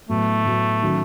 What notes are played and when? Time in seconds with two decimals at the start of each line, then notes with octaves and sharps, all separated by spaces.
0.09 A2 F#3 A3 B3
0.45 A2 F#3 B3
0.82 D#3 F#3 C#4